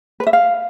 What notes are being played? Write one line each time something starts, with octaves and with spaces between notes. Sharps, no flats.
B4
E5
F5